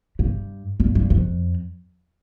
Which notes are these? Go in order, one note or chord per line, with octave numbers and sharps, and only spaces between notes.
G2
G2
G2
F2